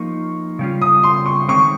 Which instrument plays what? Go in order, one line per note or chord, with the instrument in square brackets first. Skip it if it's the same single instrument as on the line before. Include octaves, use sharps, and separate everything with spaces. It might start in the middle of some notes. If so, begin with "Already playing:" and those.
Already playing: [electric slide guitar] F3 A#3 D#4 [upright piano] C#6
[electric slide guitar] C#3 G3 C#4 F4
[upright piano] D#6
C6
C#6
[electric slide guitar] D#3 G#3 C4 [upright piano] C#6